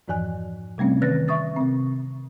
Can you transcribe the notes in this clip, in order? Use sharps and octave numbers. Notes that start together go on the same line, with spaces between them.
F2 G#2 E3 F3 G#5 F#6
C3 G3 A3 C4 C#4
D#3 E3 B4 F#6 A6 A#6
E5 C#6 D#6 A6
C3 C4